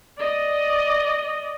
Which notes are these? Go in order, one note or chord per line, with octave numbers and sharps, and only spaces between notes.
D5 D#5